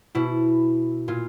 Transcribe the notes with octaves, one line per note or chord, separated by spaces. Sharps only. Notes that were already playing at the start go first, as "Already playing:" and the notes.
B2 E4
A#2 F4